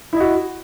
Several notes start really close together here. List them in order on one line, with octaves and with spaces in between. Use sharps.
E4 D#5 F#4